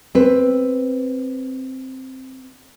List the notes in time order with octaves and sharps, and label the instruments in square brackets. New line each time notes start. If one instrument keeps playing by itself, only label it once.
[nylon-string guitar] C4 B4